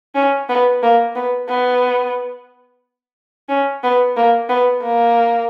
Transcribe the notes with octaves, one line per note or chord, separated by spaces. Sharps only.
C#4
B3
A#3
B3
B3
C#4
B3
A#3
B3
A#3